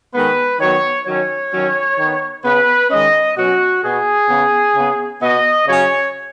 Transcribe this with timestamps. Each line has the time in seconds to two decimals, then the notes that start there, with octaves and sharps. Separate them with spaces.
0.13 D#3 G#3 B3 B4
0.59 D#3 F#3 B3 C#5
1.06 D#3 F#3 C#4 C#5
1.52 D#3 F#3 C#4
1.98 D#3 B3
2.44 C#3 B3 B4
2.90 D#3 G#3 C#4 D#5
3.36 B2 F#3 C#4 F#4
3.83 B2 B3 G#4
4.29 C#3 B3
4.75 C#3 B3
5.21 B2 B3 D#5
5.67 C#3 F#3 C#4 C#5